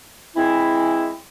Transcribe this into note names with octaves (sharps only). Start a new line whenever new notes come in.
E3 G#3 C4 E4